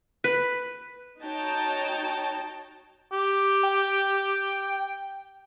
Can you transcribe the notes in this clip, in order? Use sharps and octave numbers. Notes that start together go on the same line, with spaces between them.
B4
D#4 F#4 C#5 G5 A5 A#5
G4
G5